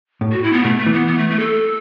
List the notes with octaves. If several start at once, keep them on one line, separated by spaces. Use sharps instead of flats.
A2
F#4
E4
B3
B2 A3
A3
E3
B3
B3
A3
A3
A4